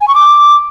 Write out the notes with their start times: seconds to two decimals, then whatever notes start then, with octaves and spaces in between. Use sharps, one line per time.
0.01 G#5
0.08 C#6
0.15 D6